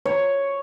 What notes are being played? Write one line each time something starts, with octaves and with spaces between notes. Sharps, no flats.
C#5